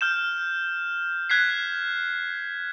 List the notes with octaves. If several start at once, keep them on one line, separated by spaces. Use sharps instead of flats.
F6 G6 E7
F#6 G#6 B6 C7